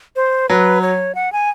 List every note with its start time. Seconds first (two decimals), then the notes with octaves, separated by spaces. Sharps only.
0.16 C5
0.49 F#3 B4
0.82 C#5
1.15 F#5
1.32 G#5